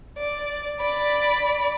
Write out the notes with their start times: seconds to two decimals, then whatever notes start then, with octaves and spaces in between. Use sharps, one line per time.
0.18 D5
0.80 D5 B5